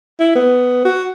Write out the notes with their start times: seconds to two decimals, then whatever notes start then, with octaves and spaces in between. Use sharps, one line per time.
0.20 E4
0.35 B3
0.85 F#4